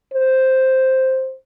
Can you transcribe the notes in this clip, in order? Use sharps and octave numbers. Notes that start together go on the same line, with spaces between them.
C5